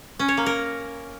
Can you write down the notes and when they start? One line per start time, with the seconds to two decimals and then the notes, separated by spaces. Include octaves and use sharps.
0.19 C#4
0.28 C#5
0.37 A#3
0.46 A#4